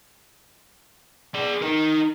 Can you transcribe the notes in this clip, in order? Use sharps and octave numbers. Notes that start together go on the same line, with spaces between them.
G#4 D5
D#4 A#4